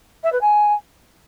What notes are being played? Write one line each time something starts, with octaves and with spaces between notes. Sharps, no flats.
E5
B4
G#5